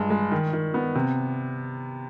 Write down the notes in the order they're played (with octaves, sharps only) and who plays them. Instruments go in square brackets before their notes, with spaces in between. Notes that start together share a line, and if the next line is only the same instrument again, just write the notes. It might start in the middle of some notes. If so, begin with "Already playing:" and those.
Already playing: [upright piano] G2 G#3
G#3
D#3
D#3
B3
C3